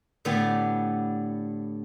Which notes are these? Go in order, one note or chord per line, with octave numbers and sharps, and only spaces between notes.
A2 D3 A3 B3 G4